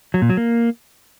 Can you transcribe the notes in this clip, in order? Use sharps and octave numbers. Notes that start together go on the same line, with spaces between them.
F#3
A#2
F#3
A#3